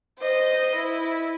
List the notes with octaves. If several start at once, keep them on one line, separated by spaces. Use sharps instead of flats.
C5 D#5
E4